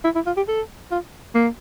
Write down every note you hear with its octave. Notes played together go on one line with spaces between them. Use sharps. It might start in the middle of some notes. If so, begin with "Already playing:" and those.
E4
E4
F4
G4
A4
F4
A#3